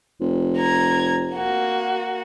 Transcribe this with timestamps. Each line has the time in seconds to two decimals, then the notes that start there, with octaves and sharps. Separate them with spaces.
0.21 F1
0.58 A#5 G#6
1.35 A#3 F#4